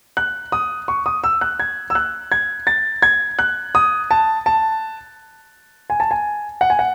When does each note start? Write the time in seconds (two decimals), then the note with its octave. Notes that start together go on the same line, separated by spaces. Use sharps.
0.17 F#6
0.52 D#6
0.88 C#6
1.06 D#6
1.24 E6
1.41 F#6
1.59 G#6
1.90 E6
1.95 F#6
2.32 G#6
2.67 A6
3.02 G#6
3.39 F#6
3.75 D#6
4.11 A5
4.46 A5
5.90 G#5
6.00 A5
6.11 G#5
6.61 F#5
6.70 G#5
6.79 F#5